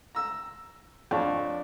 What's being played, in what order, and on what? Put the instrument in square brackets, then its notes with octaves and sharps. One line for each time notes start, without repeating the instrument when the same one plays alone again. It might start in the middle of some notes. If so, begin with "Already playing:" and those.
[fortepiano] A#5 E6
[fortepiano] F2 [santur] D4 C#5 A5